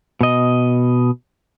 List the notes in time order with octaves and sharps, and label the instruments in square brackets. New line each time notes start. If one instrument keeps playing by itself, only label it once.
[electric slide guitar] B2 D#5